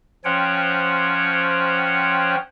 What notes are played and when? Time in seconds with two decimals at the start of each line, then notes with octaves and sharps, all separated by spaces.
0.25 F3 C#4 C5 C#5 F#5 G5